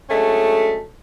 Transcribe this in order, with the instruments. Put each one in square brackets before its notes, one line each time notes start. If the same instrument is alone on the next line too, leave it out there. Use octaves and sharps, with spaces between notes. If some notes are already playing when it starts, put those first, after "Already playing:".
[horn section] D3 F#3 G#3 A3 C#4